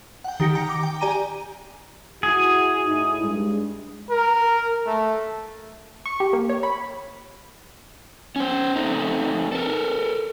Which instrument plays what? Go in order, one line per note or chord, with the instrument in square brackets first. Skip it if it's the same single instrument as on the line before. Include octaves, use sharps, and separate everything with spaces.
[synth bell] F#5 G5
D#3 G4 A#6 C#7
G5 A#5
D6
G5
G4 D5 G#5 A#5 D#7
[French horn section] E4 F#4 [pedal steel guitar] G#4
[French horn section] A2 D#4 E4
G2 G#3
[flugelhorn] A#4
A3
[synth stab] C#6
G4
A#3
C#5
B5
[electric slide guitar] C#4 C5
A3 C4 D#4
A4 A#4